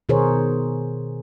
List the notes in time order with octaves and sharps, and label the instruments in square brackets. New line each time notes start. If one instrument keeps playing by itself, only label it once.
[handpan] B2 D#3 G#4 A#4 C5 C#5